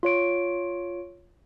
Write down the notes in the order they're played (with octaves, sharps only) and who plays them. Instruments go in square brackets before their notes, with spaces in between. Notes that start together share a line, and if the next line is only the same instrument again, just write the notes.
[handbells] F4 C#5 D7